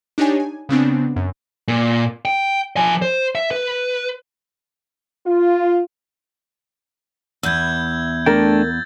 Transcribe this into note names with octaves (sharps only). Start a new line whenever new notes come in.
D4 D#4 G4 C#5 G#5
G#5
C#3 B3 C4 D4
F#2
A#2
G5
F3 G#5
C5
E5
B4
F4
E2 E4 E6 G6 G#6
A3 D4 A#4 G5 A6